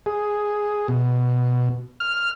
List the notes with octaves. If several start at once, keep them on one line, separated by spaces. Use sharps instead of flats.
G#4
B2
F6